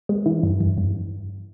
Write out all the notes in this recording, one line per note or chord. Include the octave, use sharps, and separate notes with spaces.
G#3
E3
G2
G2
G2